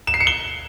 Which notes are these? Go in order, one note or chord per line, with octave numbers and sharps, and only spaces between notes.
E7
C7
C#7
G7